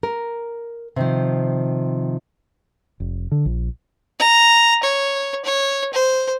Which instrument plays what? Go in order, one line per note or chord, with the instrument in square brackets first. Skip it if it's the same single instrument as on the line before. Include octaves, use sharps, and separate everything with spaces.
[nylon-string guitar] A#4
C3 D#3 F3
[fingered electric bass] F1
D3
A#1
[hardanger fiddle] A#5
C#5
C#5
C5